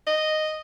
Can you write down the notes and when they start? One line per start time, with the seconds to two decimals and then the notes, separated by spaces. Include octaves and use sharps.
0.07 D#5